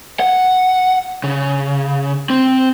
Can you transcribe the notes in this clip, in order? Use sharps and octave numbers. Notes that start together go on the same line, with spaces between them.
F#5
C#3
C4